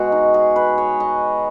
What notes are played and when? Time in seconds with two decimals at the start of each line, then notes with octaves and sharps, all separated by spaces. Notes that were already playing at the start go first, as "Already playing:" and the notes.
Already playing: B2 G#3 F#4
0.12 D#4
0.34 G#4
0.56 B4
0.78 C#5
1.00 D#5